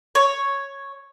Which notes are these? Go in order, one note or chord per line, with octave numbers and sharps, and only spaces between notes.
C#5